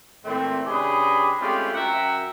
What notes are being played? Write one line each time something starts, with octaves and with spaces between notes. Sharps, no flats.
A#2 E3 A3 C4
C#3 D4 G4 G#4 B4 D#5
G#3 A3 C4 C#4 F4 G4
F#2 E5 F#5 G5 A#5